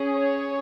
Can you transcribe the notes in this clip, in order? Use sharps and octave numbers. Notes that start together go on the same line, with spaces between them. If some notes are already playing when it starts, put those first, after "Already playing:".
Already playing: C#4 G#4
C#5